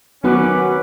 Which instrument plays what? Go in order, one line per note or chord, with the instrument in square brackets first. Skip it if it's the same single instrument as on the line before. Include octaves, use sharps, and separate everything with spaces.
[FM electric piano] D#3 B3 [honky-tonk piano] F#3 F#6 [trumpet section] C#4 B4 D6